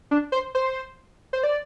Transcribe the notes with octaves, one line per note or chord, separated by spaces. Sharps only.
D4
C5
C5
C5
D5